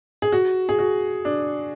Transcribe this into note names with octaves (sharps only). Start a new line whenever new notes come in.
G#4
F#4
G#4
F#4
D4